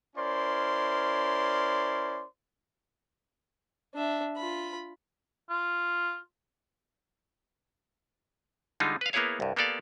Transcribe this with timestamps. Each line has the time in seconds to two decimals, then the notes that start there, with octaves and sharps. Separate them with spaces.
0.16 C#4 E4 A#4 C5 D5 C6
3.95 D4 E5
4.37 F4 B5
5.50 F4
8.80 D3 G3 G#3 D#4 F4
9.01 B4 F5
9.13 A#3 B3 E4 G#4 C#5 F5
9.40 C2 G2
9.56 A#3 B3 G4 A4 D5 F5